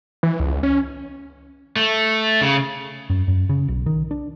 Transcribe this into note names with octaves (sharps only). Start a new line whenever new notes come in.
E3
C#2
C#4
A3
C#3
F#2
F#2
C#3
B1
D#3
D4